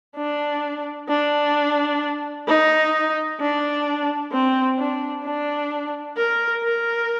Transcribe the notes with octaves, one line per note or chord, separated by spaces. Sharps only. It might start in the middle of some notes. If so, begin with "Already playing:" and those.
D4
D4
D#4
D4
C4
D4
D4
A#4
A#4